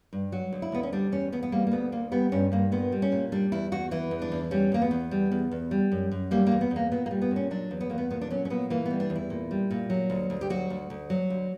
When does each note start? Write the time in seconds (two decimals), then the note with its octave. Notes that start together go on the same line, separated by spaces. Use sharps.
0.13 G2
0.32 F#3 F#4
0.53 D2
0.62 E4
0.72 D2 B3
0.83 C#4
0.93 G3 D4
1.12 E2 C#4
1.32 E2 B3
1.43 B3
1.52 G3 A#3
1.67 A#3
1.72 D2 B3
1.92 D2 A#3
2.11 G3 B3
2.32 G2 C#4
2.52 G2 A#3
2.72 A#2 B3
2.92 G3
3.02 C#4
3.12 A#2
3.32 G3 D4
3.52 E2 E4
3.72 E2 F#4
3.91 E3 E4
4.11 E2
4.22 D4
4.32 E2
4.51 G3 C#4
4.72 E2 A#3
4.82 B3
4.91 E2
5.11 G3
5.32 E2
5.51 E2
5.71 G3
5.92 F#2
6.11 F#2
6.31 G3 A#3
6.47 A#3
6.52 E2
6.61 B3
6.71 E2 A#3
6.91 A#2 B3
7.06 A#3
7.11 G3
7.22 B3
7.31 A#2
7.36 C#4
7.51 F#3 D4
7.71 E2
7.81 B3
7.90 E2 A#3
7.98 B3
8.10 A#2 B3
8.21 D4
8.30 F#3 C#4
8.45 C#4
8.50 A#2 B3
8.70 E3 A#3
8.86 G3 B3
9.00 D4
9.10 E2
9.16 E4
9.30 A#2
9.51 G3
9.71 A#2
9.90 F#3
10.10 D2
10.30 D2
10.41 G4
10.50 F#3 F#4
10.70 D2
10.90 D2
11.10 F#3
11.30 D2